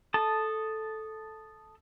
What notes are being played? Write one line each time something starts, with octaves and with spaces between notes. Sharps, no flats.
A4 A5 D#6